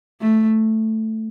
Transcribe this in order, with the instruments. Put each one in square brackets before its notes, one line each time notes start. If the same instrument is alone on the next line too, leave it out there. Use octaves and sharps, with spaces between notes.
[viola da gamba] A3